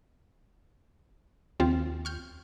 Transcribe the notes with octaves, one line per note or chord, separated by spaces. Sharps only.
D#2 F3 C4 F4
C#6 F6 G6